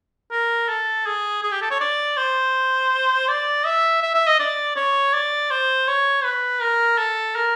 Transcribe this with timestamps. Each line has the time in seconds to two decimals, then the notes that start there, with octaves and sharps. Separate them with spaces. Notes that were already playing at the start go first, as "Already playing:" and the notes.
0.31 A#4
0.69 A4
1.06 G#4
1.43 G#4
1.52 G4
1.62 A4
1.71 C#5
1.80 D5
2.17 C5
3.28 D5
3.66 E5
4.02 E5
4.14 E5
4.27 D#5
4.39 D5
4.76 C#5
5.13 D5
5.51 C5
5.88 C#5
6.24 B4
6.61 A#4
6.98 A4
7.35 A#4